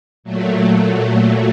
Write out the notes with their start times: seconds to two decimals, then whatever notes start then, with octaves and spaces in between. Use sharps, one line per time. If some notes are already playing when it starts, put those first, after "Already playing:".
0.24 A#2 F#3 A3